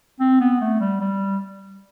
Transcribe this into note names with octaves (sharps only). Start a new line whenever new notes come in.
C4
B3
A3
G3
G3